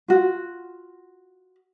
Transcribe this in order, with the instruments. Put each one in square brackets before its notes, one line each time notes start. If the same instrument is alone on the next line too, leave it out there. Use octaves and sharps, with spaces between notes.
[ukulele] F4 F#4